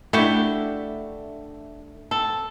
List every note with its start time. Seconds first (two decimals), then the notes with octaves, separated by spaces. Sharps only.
0.13 A3 D4 E4 F#4 G4
2.11 C4 A4